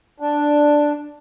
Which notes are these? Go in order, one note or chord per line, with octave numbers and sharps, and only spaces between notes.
D4